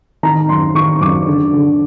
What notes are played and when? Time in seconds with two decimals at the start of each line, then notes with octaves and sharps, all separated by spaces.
0.23 D#3 A#5
0.49 F#2 C6
0.75 D#3 C#6
1.01 F#2 D6
1.26 D3
1.53 D3